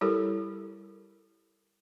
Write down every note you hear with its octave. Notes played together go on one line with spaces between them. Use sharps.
G3 E4 G4 A4 A#4